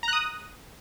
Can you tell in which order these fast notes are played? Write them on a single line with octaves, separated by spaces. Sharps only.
A#5 F#6 D#6